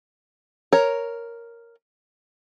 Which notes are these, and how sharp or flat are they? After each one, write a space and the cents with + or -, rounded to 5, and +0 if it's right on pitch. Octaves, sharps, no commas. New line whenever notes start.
A#4 +0 C#5 +5 A#5 +0